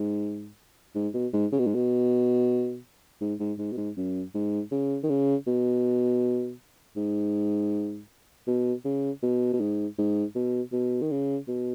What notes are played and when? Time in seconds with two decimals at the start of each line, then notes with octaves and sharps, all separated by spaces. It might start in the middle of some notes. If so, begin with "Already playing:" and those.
Already playing: G#2
0.95 G#2
1.14 B2
1.34 G#2
1.52 C#3
1.59 B2
1.67 G#2
1.75 B2
3.21 G#2
3.40 G#2
3.59 G#2
3.73 B2
3.78 G#2
3.97 F#2
4.35 G#2
4.72 C#3
5.04 D#3
5.10 C#3
5.47 B2
6.97 G#2
8.47 B2
8.85 C#3
9.23 B2
9.53 B2
9.61 G#2
9.98 G#2
10.36 B2
10.73 B2
11.02 D#3
11.11 C#3
11.49 B2